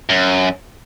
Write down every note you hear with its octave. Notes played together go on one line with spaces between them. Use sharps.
F#2